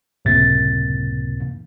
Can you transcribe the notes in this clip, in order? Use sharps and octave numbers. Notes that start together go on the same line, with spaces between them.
C#2 F#2 A2 C3 A#3 A6